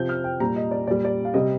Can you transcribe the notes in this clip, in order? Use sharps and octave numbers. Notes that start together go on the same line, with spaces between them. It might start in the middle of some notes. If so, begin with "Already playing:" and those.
Already playing: C3 F3 G6
F6
G5
A#2 G3 A#5
D#5
D5
A#2 G3 D5
D5
F5
C3 G3 D#5